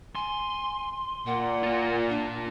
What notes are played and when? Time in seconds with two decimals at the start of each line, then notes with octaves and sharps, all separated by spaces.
0.15 G#5 C6
1.27 A#2 F#5
1.63 F4 A#4
2.09 D4